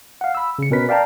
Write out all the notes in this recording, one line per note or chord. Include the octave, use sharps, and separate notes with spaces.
F5 F#5
B5 E6
C#3 C#7
B2 C#4 A#4 B4 B6
D5 F5 G5 A5 A#5